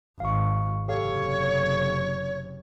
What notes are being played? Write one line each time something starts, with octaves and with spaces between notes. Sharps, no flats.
G#1 F5 C#6
F#1 C3 G4 A4 C#5 F5